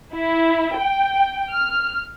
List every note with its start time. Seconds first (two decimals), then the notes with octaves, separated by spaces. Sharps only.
0.14 E4
0.79 G5
1.51 F6